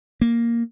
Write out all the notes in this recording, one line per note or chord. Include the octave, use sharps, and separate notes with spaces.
A#3